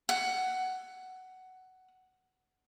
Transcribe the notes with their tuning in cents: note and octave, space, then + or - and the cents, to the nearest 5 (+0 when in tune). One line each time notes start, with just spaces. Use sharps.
F#5 +10